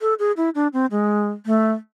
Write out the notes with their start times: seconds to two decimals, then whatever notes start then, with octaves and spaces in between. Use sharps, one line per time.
0.01 A4
0.19 G#4
0.37 E4
0.55 D4
0.73 C4
0.91 G#3
1.46 A3